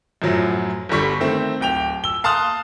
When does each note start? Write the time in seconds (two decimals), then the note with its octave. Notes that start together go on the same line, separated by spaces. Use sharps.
0.22 F#2 A2 F3 F#3
0.89 G1 D3 G3 C#6 B6
1.20 D#3 A3 C4
1.61 D1 G5 F7
2.04 E6 G7
2.24 F5 A5 C6 D#6 F6 F#6